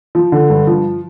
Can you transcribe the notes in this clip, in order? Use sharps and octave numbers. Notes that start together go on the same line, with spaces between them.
F3
D3
G2
F3